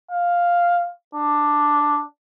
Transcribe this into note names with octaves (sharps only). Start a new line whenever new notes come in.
F5
D4